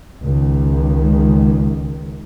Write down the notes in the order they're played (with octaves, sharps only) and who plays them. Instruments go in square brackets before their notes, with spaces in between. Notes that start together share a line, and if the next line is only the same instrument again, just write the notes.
[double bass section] C#2 D#3